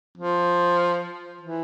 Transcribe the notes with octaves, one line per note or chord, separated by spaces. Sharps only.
F3
E3